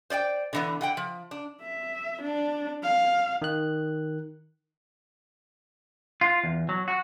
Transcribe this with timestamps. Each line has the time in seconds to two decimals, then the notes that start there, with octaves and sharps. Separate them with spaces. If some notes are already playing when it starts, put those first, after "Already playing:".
0.10 C5 D5 F#5 G5
0.53 D3 E3 B3
0.81 D3 F#5 G5
0.97 F3
1.31 D4
1.62 E5
2.23 D4
2.83 F5
3.42 D#3 F#6
6.21 F4
6.44 E2
6.69 F#3
6.88 F#4